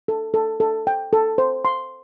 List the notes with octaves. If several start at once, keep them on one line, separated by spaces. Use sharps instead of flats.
A4
A4
A4
G5
A4
C5
C6